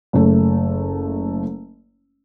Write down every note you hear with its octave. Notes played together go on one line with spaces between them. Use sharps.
F#1 A3